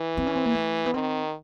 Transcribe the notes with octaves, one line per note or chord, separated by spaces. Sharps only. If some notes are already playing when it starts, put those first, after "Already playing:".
Already playing: E3
C4
C#4
C4
A#3
A3
B3
D#3 C4